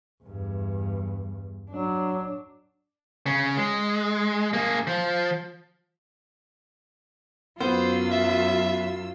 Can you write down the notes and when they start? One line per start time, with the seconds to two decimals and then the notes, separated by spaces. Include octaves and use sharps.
0.23 E2 G2
1.71 F#3 D4
3.26 C#3 C#4
3.57 G#3
4.53 A#3 G#4
4.87 F3
7.60 F#2 F#3 B3 F4 C5 E6
8.12 E5